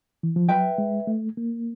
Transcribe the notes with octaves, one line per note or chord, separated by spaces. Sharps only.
E3
F3
F#3 B4 E5 G5
G#3
A3
A#3